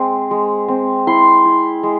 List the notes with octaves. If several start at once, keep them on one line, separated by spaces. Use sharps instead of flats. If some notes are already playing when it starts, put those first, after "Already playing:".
Already playing: G#3 C4
G#3
C4
E4 C6
E4
G#3